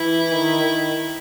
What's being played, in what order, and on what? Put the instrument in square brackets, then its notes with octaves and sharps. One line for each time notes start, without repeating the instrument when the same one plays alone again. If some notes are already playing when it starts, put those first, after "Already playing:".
Already playing: [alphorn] E3 [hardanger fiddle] E4
[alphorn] D#3
D#3